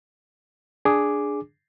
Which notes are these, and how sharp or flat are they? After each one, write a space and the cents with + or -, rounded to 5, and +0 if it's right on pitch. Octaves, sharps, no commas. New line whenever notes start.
D4 +0 G#4 +0 D6 +0